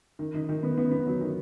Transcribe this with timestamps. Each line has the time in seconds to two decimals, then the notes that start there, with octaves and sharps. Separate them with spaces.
0.19 D#3
0.34 D#4
0.49 D#3
0.63 B3
0.78 B3
0.91 B3
1.07 F#3
1.21 D#3